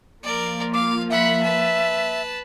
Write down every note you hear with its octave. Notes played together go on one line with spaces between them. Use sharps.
F3 A#3 F4 A#4 D5
F5 D6
E5 F#5 B5
B4 A5